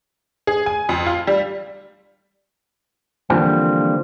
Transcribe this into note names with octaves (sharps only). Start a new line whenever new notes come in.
G#4
G#5
F2
F4
G3
D3 E3 F3 G3 A#3 C4